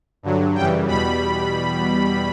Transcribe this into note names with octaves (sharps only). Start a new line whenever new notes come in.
G2 D3 F#3
F#2 C#3 E3 G3 G5
E2 B2 G3 B5